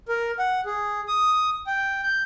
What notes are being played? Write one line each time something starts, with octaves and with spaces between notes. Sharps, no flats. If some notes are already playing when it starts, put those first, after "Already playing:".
A#4
F#5
G#4
D#6
G5
G6